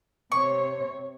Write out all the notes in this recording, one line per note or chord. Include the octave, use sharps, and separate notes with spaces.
C3 C#5 C#6